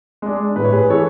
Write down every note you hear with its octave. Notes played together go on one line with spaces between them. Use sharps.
G#3 D4
A2 B4
C#5
G#4 B4
E3 A3 A4 C#5